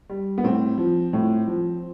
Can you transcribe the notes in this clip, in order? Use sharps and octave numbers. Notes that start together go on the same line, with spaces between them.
G3
B3
A2 C4
F3
A2
F3